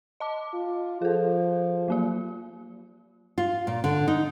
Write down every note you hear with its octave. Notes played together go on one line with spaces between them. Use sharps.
D#5 A5 D6
F4
F3 G#4 A4
F#3 A#3 F4
F4
A#2
D3
D#4